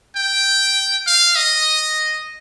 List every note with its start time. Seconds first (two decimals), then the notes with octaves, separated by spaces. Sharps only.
0.16 G5
1.07 F5
1.36 D#5